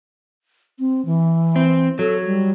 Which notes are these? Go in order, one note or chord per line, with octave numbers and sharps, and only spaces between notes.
C4
E3
C4
F#3 A4
G3